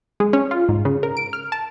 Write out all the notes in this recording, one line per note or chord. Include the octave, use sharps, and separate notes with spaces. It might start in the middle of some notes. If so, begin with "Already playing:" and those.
G#3
C#4
F4
G#2
C#3
A#4
D7
F6
A5